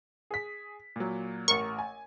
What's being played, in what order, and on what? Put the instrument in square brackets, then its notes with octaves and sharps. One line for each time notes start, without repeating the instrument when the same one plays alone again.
[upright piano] G#4 B6
A#2 F#3
[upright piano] A1 A#4 [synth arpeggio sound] C#6
[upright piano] G#5